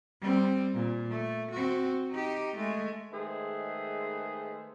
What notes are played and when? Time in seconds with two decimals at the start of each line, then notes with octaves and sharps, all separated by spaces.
0.21 G3 C4
0.74 A#2
1.10 A3
1.51 C4 F#4
2.12 D#4 G4
2.56 G#3 A3
3.12 D#3 G#3 A3 G#4 B4 C5